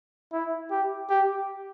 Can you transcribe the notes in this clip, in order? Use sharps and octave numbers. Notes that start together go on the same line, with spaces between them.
E4
G4
G4